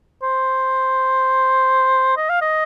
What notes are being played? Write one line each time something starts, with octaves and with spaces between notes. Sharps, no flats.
C5
D#5
F5
D#5